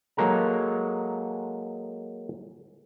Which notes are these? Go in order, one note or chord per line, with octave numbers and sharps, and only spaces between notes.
F#3 G#3 A#3 A4 A#5